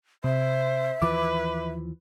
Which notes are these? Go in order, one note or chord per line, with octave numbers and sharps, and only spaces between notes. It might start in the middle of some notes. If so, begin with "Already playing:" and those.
C3 C5 E5
D#2 E3 F3 B4 D6